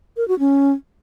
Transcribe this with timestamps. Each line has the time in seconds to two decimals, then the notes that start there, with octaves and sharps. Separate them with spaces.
0.17 A#4
0.28 F#4
0.39 C#4